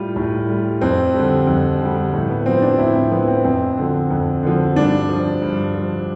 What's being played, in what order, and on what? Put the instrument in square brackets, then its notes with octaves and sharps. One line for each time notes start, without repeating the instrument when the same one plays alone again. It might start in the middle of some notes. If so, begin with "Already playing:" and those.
Already playing: [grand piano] A2 G3 F4
A2
G3
F2 C4
D3 G3
F2
D3 G3
A2
B3
F3 C4
D4
A2 E4
C4
F3 B3
C4
F2 C4
D3 F3
F2
D3 F3
G2 D4
F3
G2
F3